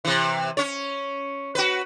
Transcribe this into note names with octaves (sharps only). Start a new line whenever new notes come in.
C3 E3
C#4 C#5
F#4 B4